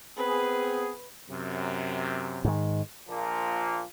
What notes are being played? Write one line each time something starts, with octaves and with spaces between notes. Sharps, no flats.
B3 C4 G#4 B4
F#2 C3
G#2 D#3
A#1 A#2 F3 A#3